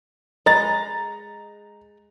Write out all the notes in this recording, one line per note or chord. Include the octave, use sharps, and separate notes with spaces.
G#3 D#5 A#5 B5 A6